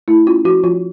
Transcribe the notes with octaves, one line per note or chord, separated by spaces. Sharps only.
A3 E4
C#4 F4
F3 F#4
F3 F4